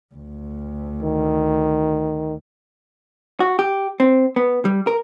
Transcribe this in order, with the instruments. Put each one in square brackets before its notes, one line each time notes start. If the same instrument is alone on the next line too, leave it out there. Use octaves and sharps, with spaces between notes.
[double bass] D2
[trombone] D#3
[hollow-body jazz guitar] F#4
G4
C4
B3
G3
A#4